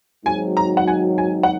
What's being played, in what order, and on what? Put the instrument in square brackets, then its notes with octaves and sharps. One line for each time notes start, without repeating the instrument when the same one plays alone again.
[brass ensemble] G#1 G#2 D#3 F#3 [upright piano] G#5
[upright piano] A#5
F#5
G#5
G#5
F#5